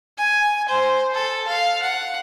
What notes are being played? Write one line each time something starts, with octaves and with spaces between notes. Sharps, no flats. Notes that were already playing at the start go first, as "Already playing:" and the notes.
G#5
C5
A4
F5
F#5